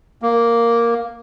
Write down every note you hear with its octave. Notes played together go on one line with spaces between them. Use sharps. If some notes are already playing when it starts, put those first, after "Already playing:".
A#3